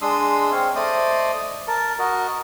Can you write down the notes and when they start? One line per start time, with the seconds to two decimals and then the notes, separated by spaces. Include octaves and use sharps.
0.01 G#3 D4 C6 D#6 E6
0.52 C4 C#5 F5
0.75 A3 C5 D5 D#5 D#6
1.68 A#4 A5
1.99 F#4 A#4 D#5